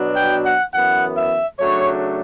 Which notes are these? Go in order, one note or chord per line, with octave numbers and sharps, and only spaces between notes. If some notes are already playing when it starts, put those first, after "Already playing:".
Already playing: B2 F#3 B3 D4
G5
F#5
F#2 E3 B3 F#5
E5
C#3 F#3 A3 D4 C#5